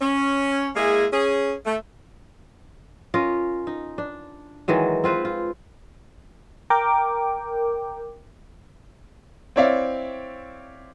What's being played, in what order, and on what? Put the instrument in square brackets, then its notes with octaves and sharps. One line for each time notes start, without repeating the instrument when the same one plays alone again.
[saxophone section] C#4
G#3 A#3 E4 G#4
C#4 G#4
A3
[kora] C#4 F4 A#4 D#5
D#4
D4
D#3 E3 F#3 G#3
C4 F4 B4 C5
F4
[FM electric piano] A#4 G5 D6
[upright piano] C4 E4 C#5 D5 E5 F5